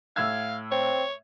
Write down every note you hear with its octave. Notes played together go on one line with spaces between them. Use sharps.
A2 F5 E6 G#6
C4 C#5